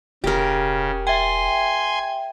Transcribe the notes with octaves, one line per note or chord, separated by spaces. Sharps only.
E1 C#3 G4 A#4
E5 G5 G#5 C6